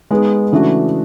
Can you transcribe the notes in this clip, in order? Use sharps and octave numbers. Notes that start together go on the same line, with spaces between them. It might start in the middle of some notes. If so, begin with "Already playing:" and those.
G#3 B3 D#4 G#4
C#3 E3 A3 D4 F#4